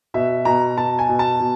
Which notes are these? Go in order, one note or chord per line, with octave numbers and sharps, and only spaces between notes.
B2 E5
B2 A#5
B2 A5
G#5
B2
A5
B2